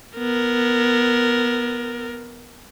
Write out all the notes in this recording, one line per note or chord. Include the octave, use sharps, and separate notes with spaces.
B3 A#4